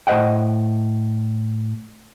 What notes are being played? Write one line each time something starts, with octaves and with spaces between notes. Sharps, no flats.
A2 C5 D#5 F#5 G5